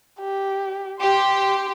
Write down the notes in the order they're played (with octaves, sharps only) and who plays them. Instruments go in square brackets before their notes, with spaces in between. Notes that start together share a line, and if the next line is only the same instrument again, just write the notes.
[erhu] G4
[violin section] G4 [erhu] C6